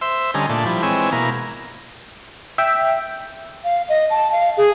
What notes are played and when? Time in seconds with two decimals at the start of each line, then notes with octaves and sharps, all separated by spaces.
0.01 C5 E5 C6 E6
0.34 D3 G3 C#4 D#5 G#5 A#5
0.49 A#2 A3 D4
0.66 F3 G3 E4
0.83 E3 G#3 C4 C#5 G#5 E6
1.12 B2 A#3 E4 A#5
2.58 E5 G5
3.64 F5
3.89 D#5
4.10 A5
4.32 F5
4.57 G#4